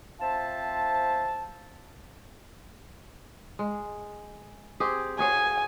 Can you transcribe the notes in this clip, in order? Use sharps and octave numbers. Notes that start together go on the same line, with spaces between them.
C4 F4 C5 E5 A5
G#3
C4 G4 G#4
F#4 G#4 C#5 G#5